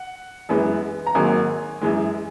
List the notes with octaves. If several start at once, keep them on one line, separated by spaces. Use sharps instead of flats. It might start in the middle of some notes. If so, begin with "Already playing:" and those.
Already playing: F#5
F#2 E3 G#3 B3
A#5
G#1 G#2 F#3 A#3 G#5
F#2 E3 G#3